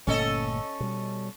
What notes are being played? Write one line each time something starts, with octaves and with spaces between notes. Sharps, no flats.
G1 A#2 A3 C#4 A4 D#5
B2 G3